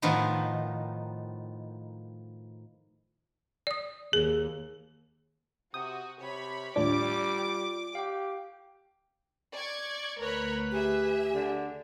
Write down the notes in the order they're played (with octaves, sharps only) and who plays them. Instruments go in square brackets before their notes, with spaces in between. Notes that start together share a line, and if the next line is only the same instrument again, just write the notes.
[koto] A2 D#3 F3 B3
[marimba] D5 D#6
[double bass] D#2 [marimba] G#4
[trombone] C3 [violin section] F#4 [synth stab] D#6 [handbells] G6
[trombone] C3 [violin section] C#5 B5
[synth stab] D#2 A2 D4 [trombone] G3 [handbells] F4 D5 [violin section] D6
[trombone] G4 [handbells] F5 G5
[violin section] D5 C#6 G#6
[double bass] D2 [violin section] A#4 C#5 B5 [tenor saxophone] B4
[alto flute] G4 [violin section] G#4 E5
[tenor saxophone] D3